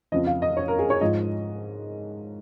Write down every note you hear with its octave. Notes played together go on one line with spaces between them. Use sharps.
F2 C#3 F3 D#5
F5
D#5
C#5
A#4
G#4
C#5
G#2 F3 D#5